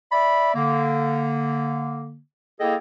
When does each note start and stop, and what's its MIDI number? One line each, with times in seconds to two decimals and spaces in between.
0.12 0.50 74
0.12 0.50 76
0.12 0.50 83
0.54 2.19 50
0.54 2.19 58
2.60 2.74 58
2.60 2.74 64
2.60 2.74 68
2.60 2.74 69
2.60 2.74 75
2.60 2.74 79